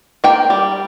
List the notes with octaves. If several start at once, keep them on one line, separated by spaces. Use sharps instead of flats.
A#3 G5
G3